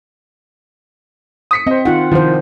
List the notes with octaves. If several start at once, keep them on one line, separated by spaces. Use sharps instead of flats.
D#6 B6 C#7
C4 C5 D#5
D#3 F4 F#5
C2 D#3 F3 C5